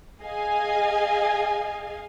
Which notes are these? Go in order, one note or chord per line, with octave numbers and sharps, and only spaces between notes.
G#4 D#5 F5 G#5